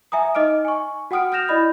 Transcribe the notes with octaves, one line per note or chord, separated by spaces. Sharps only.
E5 G#5 A#5 D#6
D#4 D#5 D6 F6 D7
G#5 C#6
F#4 F#5 G5 D#6 F6 D7
D#6 F6 G6 A#6 E7 F7
E4 D5 D#5 B5 G6